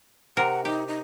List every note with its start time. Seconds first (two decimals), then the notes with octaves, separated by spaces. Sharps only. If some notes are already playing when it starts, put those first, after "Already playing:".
0.37 C3 A#4 F#5
0.65 D#4 G4
0.88 D#4